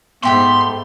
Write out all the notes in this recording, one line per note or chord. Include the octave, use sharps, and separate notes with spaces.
G#2 A3 B3 G4 B5 C6